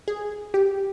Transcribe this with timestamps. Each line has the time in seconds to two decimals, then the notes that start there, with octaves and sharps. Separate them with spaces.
0.08 G#4
0.54 G4